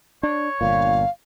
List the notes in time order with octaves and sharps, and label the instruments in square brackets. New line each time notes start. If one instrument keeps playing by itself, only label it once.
[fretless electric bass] D4 [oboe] C#5
[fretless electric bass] G1 A#2 [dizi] F5